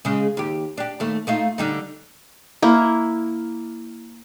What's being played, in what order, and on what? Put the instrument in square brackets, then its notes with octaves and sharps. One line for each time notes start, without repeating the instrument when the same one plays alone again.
[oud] C#3 G#3
D#2 G4
D4 G4
D#2 A3
A3 D#4 F4
D3 G3 D#4
[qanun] A#3 E4